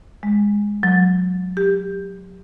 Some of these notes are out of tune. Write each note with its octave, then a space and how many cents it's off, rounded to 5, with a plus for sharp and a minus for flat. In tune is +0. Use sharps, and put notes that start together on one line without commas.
G#3 -10
F#3 -25
G4 +20